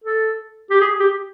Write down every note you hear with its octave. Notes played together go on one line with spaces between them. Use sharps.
A4
G4
G#4
G4